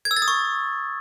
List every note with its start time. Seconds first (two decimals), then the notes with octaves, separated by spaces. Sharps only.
0.05 G#6
0.11 E6
0.16 A6
0.22 D#6
0.28 C#6